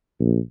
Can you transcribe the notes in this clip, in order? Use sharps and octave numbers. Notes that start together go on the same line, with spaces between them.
A#1